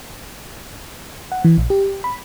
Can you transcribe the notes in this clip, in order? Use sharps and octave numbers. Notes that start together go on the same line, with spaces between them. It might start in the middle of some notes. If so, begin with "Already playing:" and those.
F#5
E3
A#1
G4
B5